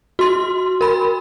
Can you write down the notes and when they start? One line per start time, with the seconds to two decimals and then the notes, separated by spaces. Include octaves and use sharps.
0.19 F#4 C6
0.81 A#4 B5